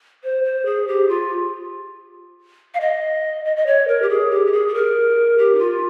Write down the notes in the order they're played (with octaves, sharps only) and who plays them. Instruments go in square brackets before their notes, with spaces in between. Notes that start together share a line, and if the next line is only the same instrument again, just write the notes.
[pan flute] C5
C5
G#4
G4
F4
F5
D#5
D#5
D#5
C#5
A#4
G4
G#4
G4
G4
G#4
G#4
A#4
G4
D#4
F4